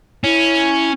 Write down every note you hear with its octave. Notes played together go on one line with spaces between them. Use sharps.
C#4 E4